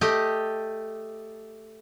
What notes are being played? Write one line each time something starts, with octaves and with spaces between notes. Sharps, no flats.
A3 G4 D#5